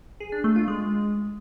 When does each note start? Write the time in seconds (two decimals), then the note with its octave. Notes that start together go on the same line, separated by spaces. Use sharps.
0.20 G#4
0.32 D4
0.44 A3
0.56 F4
0.68 G#3